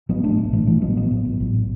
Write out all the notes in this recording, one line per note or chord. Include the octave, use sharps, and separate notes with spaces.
A1 F#3 B3
A1 A3 D4
A2
A2 E3 A3
A1 E3 A3
A1 F#3 B3
A2 F#3 B3
A2
A1
A1
A2